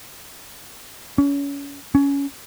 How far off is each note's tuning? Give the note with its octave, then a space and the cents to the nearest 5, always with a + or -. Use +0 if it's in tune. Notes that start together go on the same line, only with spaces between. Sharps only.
C#4 +30
C#4 +15